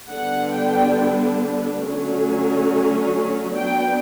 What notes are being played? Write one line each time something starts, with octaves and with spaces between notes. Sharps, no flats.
D3 G3 B3 D4 F#5
G5
D3 F#3 A3 C#4
F#3 B3 D4 G5